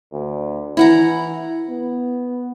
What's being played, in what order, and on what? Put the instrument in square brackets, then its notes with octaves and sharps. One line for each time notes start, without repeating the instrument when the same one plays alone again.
[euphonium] D2
[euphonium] E3 [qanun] E4 F#5 A#5
[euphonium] B3